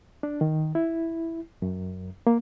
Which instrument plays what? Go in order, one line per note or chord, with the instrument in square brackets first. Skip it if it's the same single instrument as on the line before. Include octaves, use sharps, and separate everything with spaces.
[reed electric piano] D4
D#3
E4
F#2
A#3